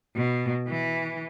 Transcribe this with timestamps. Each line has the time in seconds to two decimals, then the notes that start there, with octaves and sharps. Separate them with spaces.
0.15 B2
0.67 E3